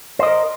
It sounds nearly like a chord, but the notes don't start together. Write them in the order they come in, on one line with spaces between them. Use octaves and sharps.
C5 D#5 A#4